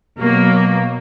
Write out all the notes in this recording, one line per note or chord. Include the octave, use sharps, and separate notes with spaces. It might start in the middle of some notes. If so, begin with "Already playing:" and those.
B2 F#3 A#3